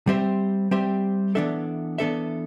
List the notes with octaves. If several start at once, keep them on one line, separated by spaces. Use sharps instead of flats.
G3 C4 G4 C5 E5
G3 C4 G4 C5 E5
E3 B3 D4 A4 E5
E3 B3 D4 A4 E5